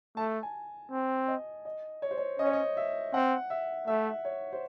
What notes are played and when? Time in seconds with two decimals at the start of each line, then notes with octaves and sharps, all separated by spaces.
0.17 A3 A5
0.43 G#5
0.91 C4
1.28 D#5
1.65 D#5
2.02 C#5
2.11 C5
2.17 C#5
2.39 C#4 D#5
2.46 C#5
2.53 D#5
2.77 E5
3.14 C4 F#5
3.50 E5
3.87 A3 E5
4.25 C#5
4.52 C5